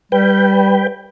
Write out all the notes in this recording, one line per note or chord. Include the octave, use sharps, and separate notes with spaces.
G3 B4 G5